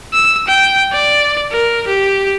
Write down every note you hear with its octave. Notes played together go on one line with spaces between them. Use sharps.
E6
G5
D5
A#4
G4